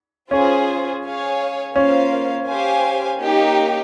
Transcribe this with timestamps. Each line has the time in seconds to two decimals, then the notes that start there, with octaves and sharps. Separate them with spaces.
0.31 C#4 F4 G#4 C5
1.03 G#4 C#5 F5 G#5
1.76 A#3 C#4 F4 C5 F5
2.48 G4 C5 F5 G#5
3.21 A#3 D#4 G4